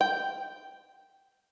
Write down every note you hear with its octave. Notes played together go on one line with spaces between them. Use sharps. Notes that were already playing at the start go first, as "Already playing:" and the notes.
G5